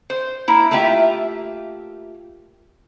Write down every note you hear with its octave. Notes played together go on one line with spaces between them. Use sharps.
C5
A#3 E4
A3 A#3 F4 G4 E5